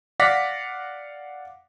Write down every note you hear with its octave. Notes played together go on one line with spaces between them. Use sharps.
D5 F5 F#5 D6 A#6 B6